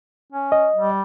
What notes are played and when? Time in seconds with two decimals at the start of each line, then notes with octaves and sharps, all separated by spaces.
0.32 C#4
0.52 D#5
0.76 G3